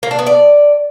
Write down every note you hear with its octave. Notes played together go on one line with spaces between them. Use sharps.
A#3
D4
B3
D5